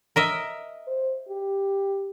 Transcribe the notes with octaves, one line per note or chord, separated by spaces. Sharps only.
A#4 D#5 E5
C5
G4